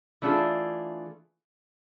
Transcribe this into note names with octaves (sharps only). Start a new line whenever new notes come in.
E3 A3 D4 F4 G#4